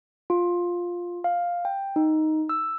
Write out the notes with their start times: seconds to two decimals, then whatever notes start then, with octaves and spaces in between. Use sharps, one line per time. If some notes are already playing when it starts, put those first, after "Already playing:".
0.30 F4
1.24 F5
1.65 G5
1.96 D#4
2.49 E6